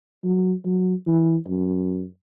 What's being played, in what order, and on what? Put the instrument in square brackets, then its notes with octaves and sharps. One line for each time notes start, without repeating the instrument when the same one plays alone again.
[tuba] F#3
F#3
E3
F#2